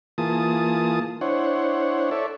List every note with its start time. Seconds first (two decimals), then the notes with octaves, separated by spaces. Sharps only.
0.18 E3 A#3 F4 G#4 A5 D#6
1.21 D4 E4 C5 C#5 F#5
2.11 A4 C#5 D5 E5